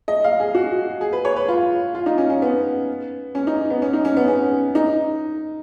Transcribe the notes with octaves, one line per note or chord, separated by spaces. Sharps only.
D#5
F5
G#4
F#4
G#4
B4
C#5
B4
F4
F4
D#4
C#4
C#4
B3
C#4
D#4
B3
C#4
D#4
C#4
B3
C#4
D#4